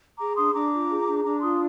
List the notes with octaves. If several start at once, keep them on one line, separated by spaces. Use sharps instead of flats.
G#4 A#5 D6
D4 C6 D#6
D4 A#5 D6
F4
G#4
D4
D4 A#5 D6
F4 C6 D#6